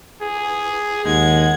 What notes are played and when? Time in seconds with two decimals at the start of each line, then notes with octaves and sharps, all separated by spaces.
0.21 G#4
1.05 D#2 G#3 F#5 G#6